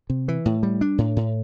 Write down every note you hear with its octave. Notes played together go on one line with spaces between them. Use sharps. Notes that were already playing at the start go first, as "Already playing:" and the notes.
C3
E3
A2
G3
D4
A2
A2